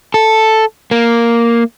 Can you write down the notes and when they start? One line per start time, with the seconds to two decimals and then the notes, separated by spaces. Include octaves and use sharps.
0.14 A4
0.91 A#3